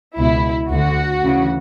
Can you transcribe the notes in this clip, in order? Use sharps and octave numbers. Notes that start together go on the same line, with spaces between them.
C#2 B2 E4
D2 D3 F#4
D2 C#3 E3